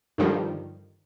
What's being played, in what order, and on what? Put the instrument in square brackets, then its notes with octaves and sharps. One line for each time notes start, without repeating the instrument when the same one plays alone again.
[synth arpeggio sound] G2 D3 D#3 F3 G3